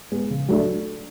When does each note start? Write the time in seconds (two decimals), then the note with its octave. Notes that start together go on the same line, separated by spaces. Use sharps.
0.12 G#3 B3
0.30 C#3
0.48 F#3 A3 D4